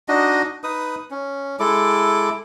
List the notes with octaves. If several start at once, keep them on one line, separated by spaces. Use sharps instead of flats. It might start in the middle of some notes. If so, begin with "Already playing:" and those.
D4 D#4 F#4 D#5
D#4 B4 D#6
C#4
G#3 E4 A4 D6